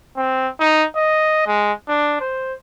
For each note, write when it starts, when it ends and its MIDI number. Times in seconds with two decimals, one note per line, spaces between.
0.17 0.49 60
0.60 0.86 63
0.97 1.45 75
1.47 1.73 56
1.88 2.18 62
2.21 2.54 72